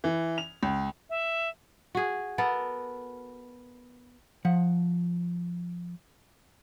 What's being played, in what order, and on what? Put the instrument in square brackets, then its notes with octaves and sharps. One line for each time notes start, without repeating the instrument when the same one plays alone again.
[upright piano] E3
F7
C#2
[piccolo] E5
[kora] F#4 G#4
B3 A4 A#4
[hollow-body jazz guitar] F3 F#5